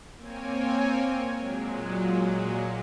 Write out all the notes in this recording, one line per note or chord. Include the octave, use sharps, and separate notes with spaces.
A#3 C4 C#5 G#5
A#2 F#3 G#3